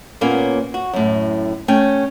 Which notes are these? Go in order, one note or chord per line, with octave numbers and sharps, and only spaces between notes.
A#2 A#3 B3 C#4
F#4
F#2 A2
A3 C#4 C#5 G5